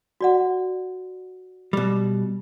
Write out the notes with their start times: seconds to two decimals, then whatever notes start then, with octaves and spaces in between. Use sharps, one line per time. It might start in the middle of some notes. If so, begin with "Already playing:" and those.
0.21 F#4 D5 F#5
1.73 B2 G3